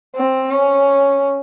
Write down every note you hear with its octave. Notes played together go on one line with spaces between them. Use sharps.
C4
C#4